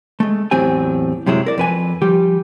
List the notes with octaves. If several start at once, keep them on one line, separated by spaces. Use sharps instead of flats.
G#3 A3
E2 A2 F#3 C4 G4 G#5
F#2 C3 F#3 G#3 E4
A#4 D5
F2 B4 G#5
F3 G3 G4